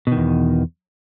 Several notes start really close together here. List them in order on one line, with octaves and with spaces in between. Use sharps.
B2 D#3 E2